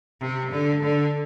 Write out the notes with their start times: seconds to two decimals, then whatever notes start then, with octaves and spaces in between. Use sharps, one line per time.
0.21 C3
0.51 D3
0.82 D3